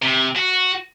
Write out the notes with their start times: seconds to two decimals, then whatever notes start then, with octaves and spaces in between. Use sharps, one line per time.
0.02 C3
0.36 F#4